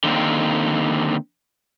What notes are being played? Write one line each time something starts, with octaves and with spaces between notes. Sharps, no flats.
D3 D#3 A#3 C4